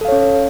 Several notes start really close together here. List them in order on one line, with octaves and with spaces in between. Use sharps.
A4 F5 C#5 C#4